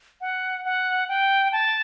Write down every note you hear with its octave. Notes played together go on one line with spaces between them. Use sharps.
F#5
F#5
G5
A5